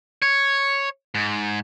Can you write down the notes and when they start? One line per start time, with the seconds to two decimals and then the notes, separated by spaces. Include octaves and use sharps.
0.22 C#5
1.15 G#2